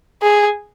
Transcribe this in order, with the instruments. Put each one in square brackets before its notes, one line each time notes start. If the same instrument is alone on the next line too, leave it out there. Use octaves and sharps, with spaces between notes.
[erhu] G#4